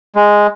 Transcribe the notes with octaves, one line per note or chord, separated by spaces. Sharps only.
G#3